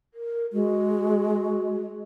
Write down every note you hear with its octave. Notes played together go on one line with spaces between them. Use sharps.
A#4
G#3 F#4